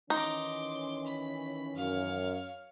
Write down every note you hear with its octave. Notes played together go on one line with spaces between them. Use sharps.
D#3 E3 C#4 D#4 C6 D6
B5
F#2 C#5 F5